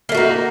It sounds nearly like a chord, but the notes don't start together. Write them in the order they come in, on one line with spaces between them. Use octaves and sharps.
A#3 A3 F#4 D#4